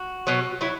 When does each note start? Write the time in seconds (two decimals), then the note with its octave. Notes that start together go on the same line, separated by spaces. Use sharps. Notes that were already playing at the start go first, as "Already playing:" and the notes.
Already playing: F#4
0.27 B2 F#3
0.61 F#3 E4